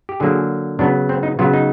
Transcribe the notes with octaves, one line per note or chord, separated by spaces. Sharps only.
G4
D3 F#3 A#3 G#4
C#3 F#3 B3 D4
C4
D#4
C#3 F#3 B3 F4
D#4